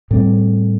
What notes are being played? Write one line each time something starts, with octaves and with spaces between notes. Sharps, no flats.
A2 G3 C4